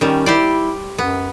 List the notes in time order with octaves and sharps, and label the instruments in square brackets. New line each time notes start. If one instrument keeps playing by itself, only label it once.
[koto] D#3 G3 [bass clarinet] C#4
[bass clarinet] E4 [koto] G4 C5 D5
[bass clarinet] F#2 [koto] B3